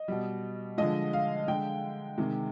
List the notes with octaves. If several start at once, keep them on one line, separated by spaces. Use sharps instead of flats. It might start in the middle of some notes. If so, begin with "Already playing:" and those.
Already playing: D#5
B2 G3
D3 F3 G#3 D#5
F5
D3 G#3 G5
C3 D#3 G#3